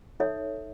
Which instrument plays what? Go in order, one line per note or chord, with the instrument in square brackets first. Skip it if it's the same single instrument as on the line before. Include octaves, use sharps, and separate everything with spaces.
[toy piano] D#4 A4 C#5 E5